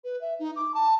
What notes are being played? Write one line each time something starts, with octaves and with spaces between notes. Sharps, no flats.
B4
E5
D#4
D6
A5